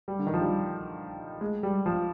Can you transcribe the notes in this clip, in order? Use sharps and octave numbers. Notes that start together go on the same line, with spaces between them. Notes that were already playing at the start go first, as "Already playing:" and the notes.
G3
D3
D#3
F3
G3
G#3
G3
F3